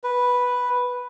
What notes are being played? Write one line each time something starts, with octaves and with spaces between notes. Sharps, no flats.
B4